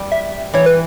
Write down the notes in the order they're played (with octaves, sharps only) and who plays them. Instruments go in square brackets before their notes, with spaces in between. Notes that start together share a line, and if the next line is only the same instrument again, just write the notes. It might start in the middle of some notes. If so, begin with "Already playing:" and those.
Already playing: [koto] G3
[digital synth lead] E5
[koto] E3 [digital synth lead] C#5
[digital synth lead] B4